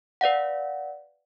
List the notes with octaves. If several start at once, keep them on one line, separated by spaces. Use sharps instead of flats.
B4 D5 F5 F#5